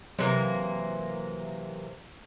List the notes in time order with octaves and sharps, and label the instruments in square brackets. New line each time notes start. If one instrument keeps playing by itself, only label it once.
[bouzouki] C3 E3 A#3 [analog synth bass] F#3